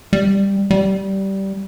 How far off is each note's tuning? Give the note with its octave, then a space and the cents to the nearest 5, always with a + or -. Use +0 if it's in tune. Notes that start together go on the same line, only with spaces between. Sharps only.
G3 +10
G3 -15